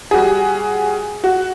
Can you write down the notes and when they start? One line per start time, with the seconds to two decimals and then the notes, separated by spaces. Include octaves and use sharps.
0.11 G3 F#4 G#4
1.24 F#4